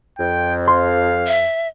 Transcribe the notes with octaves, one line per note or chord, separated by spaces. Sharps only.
F2 G5
F5 C6
E5